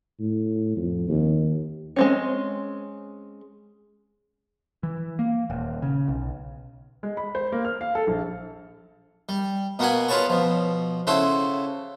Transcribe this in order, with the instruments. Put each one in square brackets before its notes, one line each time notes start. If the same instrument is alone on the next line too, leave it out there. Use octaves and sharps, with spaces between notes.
[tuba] A2
F2
D#2
[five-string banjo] G#3 C4 C#4
[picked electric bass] E3
A#3
D#1
C#3
B1
[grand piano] G#3
B5
C5
A#3
F6
F5
A4
A#1
[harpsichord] G3
B2 A#3 B3 F#4 F#5 G#5
F4 G#4 B4 C#5 A5 C#6
B2 F3
C#3 E4 F#4 A4 C5